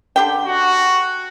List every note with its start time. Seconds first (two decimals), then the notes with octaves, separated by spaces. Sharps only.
0.16 D3 G4 G5
0.46 F#4